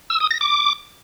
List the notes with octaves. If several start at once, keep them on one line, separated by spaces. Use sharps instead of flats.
E6
D#6
A#6
D6